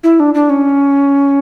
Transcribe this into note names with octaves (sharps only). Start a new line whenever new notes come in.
E4
D4
D4
C#4